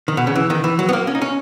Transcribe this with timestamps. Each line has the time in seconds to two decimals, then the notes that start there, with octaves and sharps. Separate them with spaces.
0.08 D#3
0.17 B2
0.27 C#3
0.35 E3
0.50 D#3
0.64 E3
0.79 F#3
0.89 B3
0.93 A#3
1.07 C#4
1.15 D#4
1.22 C#4